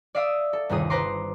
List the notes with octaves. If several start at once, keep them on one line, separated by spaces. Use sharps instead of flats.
D5 E5 F5 D#6 E6
A4
G1 D#2 C3 G#4 D#6
B4 C5 A#5 C6 D6